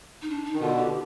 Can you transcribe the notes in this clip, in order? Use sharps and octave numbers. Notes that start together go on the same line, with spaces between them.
D#4
D4
D#4
D#3
B2 D3 F4
G4